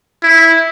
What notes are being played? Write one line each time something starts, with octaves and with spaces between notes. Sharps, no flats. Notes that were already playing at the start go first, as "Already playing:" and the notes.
E4